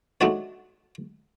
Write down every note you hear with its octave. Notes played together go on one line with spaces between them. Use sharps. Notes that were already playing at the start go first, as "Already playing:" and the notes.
G#3 A3 D4 D#4 F#4 C#5